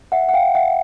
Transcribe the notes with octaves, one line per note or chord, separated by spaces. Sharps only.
E5 F#5
F#5
F5 G5
E5 F#5